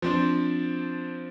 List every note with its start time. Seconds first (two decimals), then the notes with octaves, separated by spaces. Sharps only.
0.02 F3 C4 D4